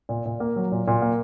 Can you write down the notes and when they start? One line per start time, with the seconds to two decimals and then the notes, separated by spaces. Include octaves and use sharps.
0.09 A#2
0.26 A#2
0.40 A#3
0.56 F#3
0.72 A#2
0.88 A#2
1.02 A#3